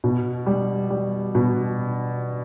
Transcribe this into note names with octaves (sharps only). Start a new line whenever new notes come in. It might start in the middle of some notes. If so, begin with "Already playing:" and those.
B2
G3
G3
B2